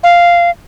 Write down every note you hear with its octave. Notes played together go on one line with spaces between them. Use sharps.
F5